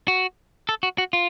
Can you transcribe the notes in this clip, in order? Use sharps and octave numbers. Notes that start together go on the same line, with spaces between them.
F#4
A4
F#4
F#4
F4